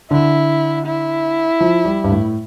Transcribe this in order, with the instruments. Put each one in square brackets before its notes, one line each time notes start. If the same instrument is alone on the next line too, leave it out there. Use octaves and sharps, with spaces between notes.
[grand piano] D3 [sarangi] E4
[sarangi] E4
[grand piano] F3
G3
G2
A2